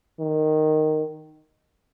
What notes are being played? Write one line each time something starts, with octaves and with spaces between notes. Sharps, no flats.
D#3